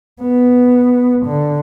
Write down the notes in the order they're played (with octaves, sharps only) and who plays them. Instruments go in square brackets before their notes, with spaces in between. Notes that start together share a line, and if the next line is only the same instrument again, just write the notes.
[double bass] B3
D3